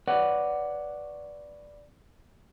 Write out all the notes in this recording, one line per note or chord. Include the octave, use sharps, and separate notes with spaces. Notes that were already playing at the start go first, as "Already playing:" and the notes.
B4 C#5 D5 F#5